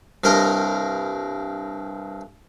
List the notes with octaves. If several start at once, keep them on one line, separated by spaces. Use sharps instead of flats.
C2 G2 A#4 D#5 A#5